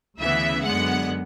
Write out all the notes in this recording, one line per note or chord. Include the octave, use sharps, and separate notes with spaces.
D2 C#3 E3 B3 E5
F#2 D3 G#3 B3 F#5